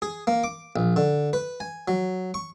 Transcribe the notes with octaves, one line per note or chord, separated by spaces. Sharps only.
G#4
A#3
D6
A#1
D3
B4
G#5
F#3
C#6